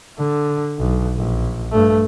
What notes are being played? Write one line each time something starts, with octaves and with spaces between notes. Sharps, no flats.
D3
B1
A#1
G2 A3